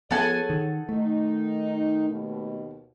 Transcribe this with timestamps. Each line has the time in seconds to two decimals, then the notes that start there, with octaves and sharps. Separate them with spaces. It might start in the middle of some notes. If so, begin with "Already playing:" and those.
0.11 F3 B3 G#4 A4 C#5 F#5 G#5
0.50 D#3
0.89 D#3 A3 D#4
2.08 D#2 B2